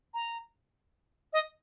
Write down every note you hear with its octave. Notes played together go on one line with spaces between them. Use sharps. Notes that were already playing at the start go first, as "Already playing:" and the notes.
A#5
D#5